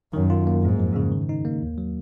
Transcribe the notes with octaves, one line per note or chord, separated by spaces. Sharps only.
F#2 D#3
F4
A#3
F2 G#2
F3
C#3
D#3
D#4
A#3
D#2
F#3